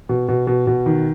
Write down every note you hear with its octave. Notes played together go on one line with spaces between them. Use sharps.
B2
B2
B2
B2
D#3